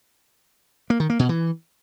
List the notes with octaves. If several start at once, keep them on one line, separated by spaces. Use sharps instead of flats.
A#3
D#3
A#3
B2
E3